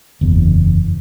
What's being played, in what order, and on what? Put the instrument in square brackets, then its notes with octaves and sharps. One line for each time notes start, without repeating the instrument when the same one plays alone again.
[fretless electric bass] F#1 E2